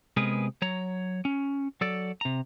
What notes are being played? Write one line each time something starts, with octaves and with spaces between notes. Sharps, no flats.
C3 G#3 B3 G#4 A#4 B4
F#3 C#5 A#5
C#4
F#3 A4 D5
C3 A#5